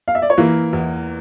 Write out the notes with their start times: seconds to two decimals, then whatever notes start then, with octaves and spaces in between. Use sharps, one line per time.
0.08 F5
0.15 E5
0.22 D5
0.30 C#5
0.37 E3 A#3 A#4
0.73 E2